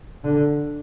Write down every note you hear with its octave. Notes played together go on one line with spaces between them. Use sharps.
D3